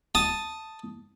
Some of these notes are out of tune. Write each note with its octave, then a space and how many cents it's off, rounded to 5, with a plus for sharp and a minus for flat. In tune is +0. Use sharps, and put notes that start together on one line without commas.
A5 +0 D#6 +0